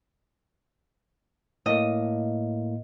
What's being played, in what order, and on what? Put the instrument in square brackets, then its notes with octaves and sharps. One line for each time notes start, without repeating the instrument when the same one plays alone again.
[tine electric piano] A2 A#3 [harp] D#5